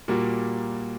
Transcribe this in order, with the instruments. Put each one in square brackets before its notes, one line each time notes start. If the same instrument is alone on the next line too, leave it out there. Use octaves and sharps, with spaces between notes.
[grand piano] A#2 G3 A#3 F#4